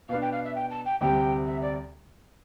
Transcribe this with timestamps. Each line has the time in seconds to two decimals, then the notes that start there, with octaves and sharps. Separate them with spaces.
0.09 B2 F5
0.12 B3 D4
0.22 G5
0.32 F5
0.44 E5
0.55 G5
0.70 A5
0.85 G5
1.00 D2 C3 G3 G5
1.47 E5
1.62 D5